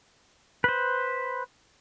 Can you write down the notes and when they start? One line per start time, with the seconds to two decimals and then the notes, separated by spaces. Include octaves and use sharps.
0.64 B4 C5